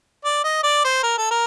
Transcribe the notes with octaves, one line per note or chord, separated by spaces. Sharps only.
D5
D#5
D5
C5
A#4
A4
A#4